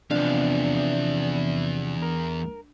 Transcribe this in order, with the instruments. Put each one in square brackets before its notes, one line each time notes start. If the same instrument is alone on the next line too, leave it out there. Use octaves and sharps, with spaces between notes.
[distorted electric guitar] E2 F5 [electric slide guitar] C3 F3 B3 [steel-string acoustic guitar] D4
[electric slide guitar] A#4